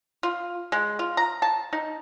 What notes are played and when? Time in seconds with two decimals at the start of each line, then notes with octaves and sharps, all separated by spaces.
0.23 F4
0.72 G#3
0.99 F4
1.17 A#5
1.42 A5
1.73 D#4